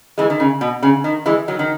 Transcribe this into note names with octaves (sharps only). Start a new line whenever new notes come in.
E3 G#3
D#3
C#3
B2
C#3
D#3
E3 G#3
D#3 F#3
D#3